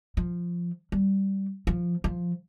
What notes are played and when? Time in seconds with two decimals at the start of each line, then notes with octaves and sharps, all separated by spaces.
0.17 F3
0.92 G3
1.67 F3
2.04 F3